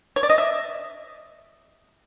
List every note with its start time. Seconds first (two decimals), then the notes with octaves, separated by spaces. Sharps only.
0.16 C#5
0.23 D5
0.30 D#5
0.38 E5